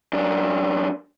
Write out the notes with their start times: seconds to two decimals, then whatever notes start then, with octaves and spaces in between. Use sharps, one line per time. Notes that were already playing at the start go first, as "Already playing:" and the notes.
0.13 F#2 D4